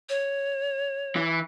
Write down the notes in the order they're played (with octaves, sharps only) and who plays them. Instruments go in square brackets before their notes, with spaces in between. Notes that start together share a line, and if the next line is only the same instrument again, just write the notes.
[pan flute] C#5
[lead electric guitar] E3